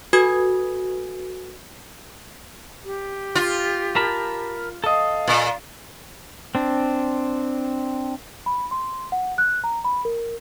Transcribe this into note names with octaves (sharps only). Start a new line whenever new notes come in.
F#4 A4 B4 G#5 D#6 G#6
G4
F4
A#4 A5 B5
A4 D#5 F5
A#2
C4 D4
B5
C6
F#5
F#6
A#5
B5
A#4